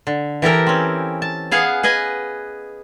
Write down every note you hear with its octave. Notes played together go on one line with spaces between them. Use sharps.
D3
E3 G4 A4 A#4
C4 C#4
A5
B3 G#4 F5 F#5 G#5
G#4 B4 D#5 G#5